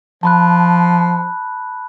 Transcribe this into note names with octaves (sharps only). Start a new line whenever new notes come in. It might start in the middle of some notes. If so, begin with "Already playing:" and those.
F3 A5 B5 F#6